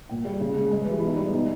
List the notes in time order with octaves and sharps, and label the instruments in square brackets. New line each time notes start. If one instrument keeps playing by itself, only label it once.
[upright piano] A#2 G5
G3
C#3
G#3
G#3 D#5
B4
E3 G4
E4
B2 D#4
G3 E4
B2 D#4